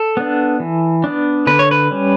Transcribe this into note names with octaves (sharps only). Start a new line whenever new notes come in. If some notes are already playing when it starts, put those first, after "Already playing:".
Already playing: A4
B3 D4
E3
B3 D4
D3 B4
C#5
B4
G3 C#4